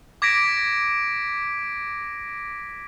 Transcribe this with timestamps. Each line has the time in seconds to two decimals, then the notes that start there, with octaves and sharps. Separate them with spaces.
0.22 D6 G#6 A#6 B6 D7